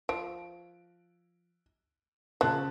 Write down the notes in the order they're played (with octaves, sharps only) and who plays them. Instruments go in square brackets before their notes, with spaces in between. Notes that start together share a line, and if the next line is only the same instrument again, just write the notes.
[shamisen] F3 [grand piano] D7
[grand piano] C#3 A5 F#6 [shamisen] F3